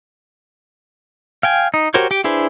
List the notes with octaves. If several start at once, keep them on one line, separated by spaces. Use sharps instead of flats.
F5 G5 G#5
D#4
F#4 G4 A#4 C5 C#5
G4 G5
D4 E4 G#4 B4 C5